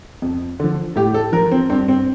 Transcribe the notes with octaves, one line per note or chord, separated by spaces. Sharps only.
F2
D3 F3
A2 G4
A4
F3 A#4
C4
G2 C4
C4